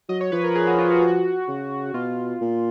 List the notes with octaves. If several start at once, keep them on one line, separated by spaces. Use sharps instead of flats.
F#3 D#5
C#5
F3 B4
A#4
G#4
F#4
F4
F#4
F#4
C#3
B2 F4
A#2